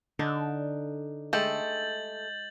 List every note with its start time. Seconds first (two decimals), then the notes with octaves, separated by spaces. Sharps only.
0.19 D3 D4 D#4
1.33 G#3 A3 G4 A4 G6 A6 F#7